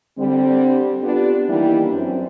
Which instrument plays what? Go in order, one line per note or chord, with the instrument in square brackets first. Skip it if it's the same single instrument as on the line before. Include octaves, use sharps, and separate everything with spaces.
[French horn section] D3 G3 C4
B3 D4 F4 G4
D#3 E3 G3 A#3 D4 E4
F#2 C4